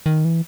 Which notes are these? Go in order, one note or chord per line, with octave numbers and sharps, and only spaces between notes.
D#3
E3